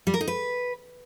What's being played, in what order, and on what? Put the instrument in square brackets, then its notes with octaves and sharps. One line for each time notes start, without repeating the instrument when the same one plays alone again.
[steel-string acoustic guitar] G3
A#4
D#4
B4